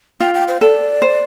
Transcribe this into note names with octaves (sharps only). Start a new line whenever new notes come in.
F4 G5
G5
C5
A4 D5
C5